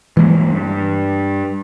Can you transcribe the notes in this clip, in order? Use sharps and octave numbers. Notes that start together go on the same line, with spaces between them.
E3 G3 G#3 A#3
G2